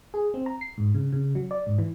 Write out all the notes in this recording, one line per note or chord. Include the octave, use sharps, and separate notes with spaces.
G#4
C4
A#5
C7
G#2
C#3
C#3
F#3
D5
G#2
E3